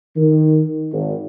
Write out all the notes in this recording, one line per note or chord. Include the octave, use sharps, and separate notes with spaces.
D#3
G#1